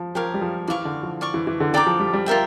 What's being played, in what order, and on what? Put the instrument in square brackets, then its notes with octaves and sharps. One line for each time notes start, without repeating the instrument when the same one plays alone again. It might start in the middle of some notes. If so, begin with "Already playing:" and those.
Already playing: [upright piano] F3
[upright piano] F3 [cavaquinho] G4 A#4 C#5 F5
[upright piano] G3
F3
[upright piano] E3 [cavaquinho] D5 F5 C#6
[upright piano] D3
F3
[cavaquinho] D5 F5 C#6
[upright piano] E3
E3
D3
[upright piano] D3 [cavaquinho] D5 G5 A#5 D6
[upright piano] F3
G3
G3
[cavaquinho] F4 A#4 E5 G5